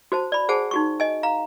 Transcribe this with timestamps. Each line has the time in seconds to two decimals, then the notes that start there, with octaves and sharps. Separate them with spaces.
0.12 F#4 C5 A5
0.32 D5 B5
0.49 G#4 C5 F#5 G#5 A5
0.71 D#4 F#4 C#6
1.00 D#5 G#5
1.23 F5 A#5